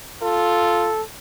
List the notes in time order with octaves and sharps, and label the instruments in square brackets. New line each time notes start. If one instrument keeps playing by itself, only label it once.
[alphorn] F4 [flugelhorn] A4